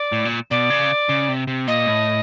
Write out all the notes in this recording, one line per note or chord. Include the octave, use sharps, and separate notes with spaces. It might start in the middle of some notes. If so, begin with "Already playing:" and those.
Already playing: D5
A2
A#2
B2 D5
C#3
C#3
C3
C3
A#2 D#5
A2